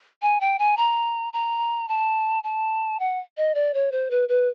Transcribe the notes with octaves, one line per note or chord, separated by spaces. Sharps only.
G#5
G5
G#5
A#5
A#5
A5
A5
F#5
D#5
D5
C#5
C5
B4
B4